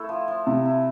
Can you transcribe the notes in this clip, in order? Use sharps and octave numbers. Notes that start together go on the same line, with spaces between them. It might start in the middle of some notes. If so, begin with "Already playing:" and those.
Already playing: A3 E4
F3
F3
C3 E4
E4